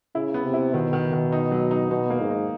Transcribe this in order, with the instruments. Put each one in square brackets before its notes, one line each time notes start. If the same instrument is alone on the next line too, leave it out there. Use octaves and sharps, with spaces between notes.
[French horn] C#3 [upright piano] E4
[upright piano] B3
[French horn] C3
[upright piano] E4
[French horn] B2 [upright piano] D#3
[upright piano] D#3
D#3
D#4
F#3
D#4
[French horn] B2 [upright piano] D#4
[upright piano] A#3
[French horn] G#2
[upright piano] D#4